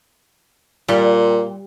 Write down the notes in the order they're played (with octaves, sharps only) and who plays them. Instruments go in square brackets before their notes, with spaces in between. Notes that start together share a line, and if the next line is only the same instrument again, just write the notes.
[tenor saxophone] A#2 [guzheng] G3